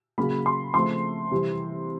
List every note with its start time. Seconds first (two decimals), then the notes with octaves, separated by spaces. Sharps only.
0.18 C#3 F#3 A#3 B5
0.46 C6
0.74 C#3 F3 A3 C4 C6
1.31 C3 E3 G3 C4